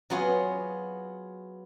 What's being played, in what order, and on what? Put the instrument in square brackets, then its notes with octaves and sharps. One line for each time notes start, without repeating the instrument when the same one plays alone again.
[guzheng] F#3 B3 F4 F#4 G#4 C#5